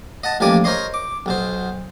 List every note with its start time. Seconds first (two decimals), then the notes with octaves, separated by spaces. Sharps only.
0.23 D#5 F#5 A5
0.40 A1 F3 G3 A#3 G#5 D6
0.64 A#4 C5 C#5 D#5 C6
0.94 D6
1.26 B1 B2 C5